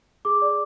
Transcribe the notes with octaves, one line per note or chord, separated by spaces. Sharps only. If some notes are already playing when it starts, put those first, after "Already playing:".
G#4 D6
D5